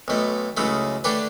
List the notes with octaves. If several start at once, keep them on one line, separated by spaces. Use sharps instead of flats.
B1 B2 A3
C#2 C#3 F#3 A3 E4
D3 A3 D4 G4 B4